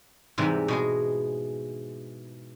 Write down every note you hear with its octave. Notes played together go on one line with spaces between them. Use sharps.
G#2 C3 E3 G3
B2 G#3 G#4